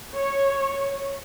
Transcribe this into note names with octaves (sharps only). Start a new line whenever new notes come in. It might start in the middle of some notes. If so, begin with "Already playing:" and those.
C#5